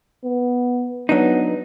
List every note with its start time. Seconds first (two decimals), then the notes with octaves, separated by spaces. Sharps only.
0.24 B3
1.09 F#3 B3 D4 D#4